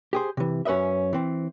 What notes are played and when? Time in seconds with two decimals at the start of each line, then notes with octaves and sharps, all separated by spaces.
0.13 G4 G#4 C5
0.37 C3 E3
0.65 F#2 C#4 B4 D#5 E5
1.13 E3 C4